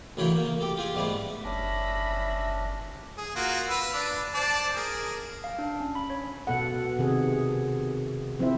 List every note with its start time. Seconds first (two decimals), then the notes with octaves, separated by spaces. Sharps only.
0.17 D2 C#3 E3 A#4 C#5 G5
0.35 A#3
0.61 G4 A4
0.77 F4 G4 G#4
0.95 G#2 G3 A3 B3
1.44 F#1 C#4 D4 E5 B5 A#6
3.18 G#4
3.36 A#3 F4 F#4
3.69 B4 F5 E6
3.94 D4
4.34 C5 D5 A5
4.76 G#4 A#4
5.44 F5
5.59 D4
5.80 C#4
5.95 B5
6.10 C#5
6.47 B2 B3 A4 F#5
6.99 C3 D#3 G#4
8.39 F3 C4 E4 C5 E5